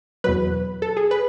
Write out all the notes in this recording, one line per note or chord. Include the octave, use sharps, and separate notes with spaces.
E2 B2 F#3 B4
A4
G#4
B4